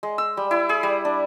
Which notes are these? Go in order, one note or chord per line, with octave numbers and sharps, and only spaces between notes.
G#3
E6
G3
E4
G#4
G3
D4